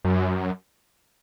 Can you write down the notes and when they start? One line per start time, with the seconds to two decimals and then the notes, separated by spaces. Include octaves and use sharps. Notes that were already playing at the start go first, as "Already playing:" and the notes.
0.05 F#2